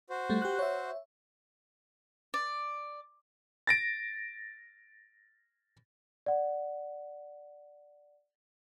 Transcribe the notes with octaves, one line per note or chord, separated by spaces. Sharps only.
F#4 C5
G3 A3
G4 F#6
C#5 E5
D5
A6 A#6 D7
D5 F#5